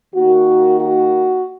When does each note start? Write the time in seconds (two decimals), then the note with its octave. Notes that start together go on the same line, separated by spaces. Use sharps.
0.14 D#3 A#3 D#4 F#4
0.79 F#4